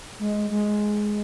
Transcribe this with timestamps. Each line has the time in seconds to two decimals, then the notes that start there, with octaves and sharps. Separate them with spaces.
0.19 G#3
0.50 G#3